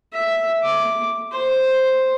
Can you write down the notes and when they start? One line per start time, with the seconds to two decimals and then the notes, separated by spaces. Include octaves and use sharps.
0.13 E5
0.63 D6
1.32 C5